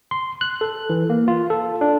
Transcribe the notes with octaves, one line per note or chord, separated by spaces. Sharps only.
C6
F#6
A4
E3
A#3
F4
A4
D4